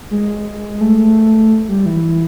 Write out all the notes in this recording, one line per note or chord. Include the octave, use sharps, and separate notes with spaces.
G#3
A3
A3
G3
E3